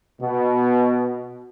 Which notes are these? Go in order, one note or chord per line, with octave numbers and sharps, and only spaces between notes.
B2